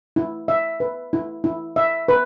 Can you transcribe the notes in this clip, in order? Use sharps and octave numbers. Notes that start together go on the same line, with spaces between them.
E4
E5
B4
E4
E4
E5
B4